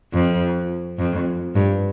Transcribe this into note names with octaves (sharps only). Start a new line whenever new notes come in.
F2
F2
G2